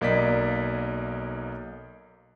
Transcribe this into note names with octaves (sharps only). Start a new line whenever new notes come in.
B1 A#3 D5 D#5 B6